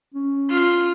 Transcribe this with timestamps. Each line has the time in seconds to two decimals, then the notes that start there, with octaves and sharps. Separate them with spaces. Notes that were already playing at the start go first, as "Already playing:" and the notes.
0.14 C#4
0.49 F4 F5